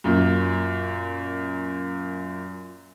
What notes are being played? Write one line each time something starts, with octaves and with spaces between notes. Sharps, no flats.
F#2 A#2